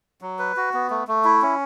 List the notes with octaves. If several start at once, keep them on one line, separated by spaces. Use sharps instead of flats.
F#3
B4
F#4
B3
A3
A3
E4
C#4